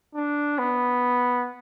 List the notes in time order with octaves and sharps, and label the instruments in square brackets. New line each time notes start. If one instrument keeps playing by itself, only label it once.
[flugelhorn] D4
B3